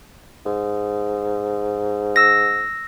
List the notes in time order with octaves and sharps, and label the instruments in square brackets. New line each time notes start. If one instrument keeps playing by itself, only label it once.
[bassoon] G#2
[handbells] E6 A#6